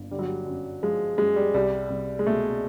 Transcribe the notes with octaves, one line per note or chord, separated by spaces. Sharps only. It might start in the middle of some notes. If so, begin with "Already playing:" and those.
Already playing: G1
D3 G3
F#3
G3
F#2
F3 G#3
F#2 G#3
G3
C2 G3
C2
G#3
B2 A3